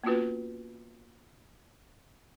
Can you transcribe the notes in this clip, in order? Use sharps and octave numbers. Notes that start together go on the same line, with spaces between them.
A#3 B3 C#4 F4 F#4 B4